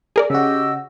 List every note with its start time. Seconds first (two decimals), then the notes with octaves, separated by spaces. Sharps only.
0.16 G#4 A#4 D5
0.30 C#3 F#4 G4 D#5 E6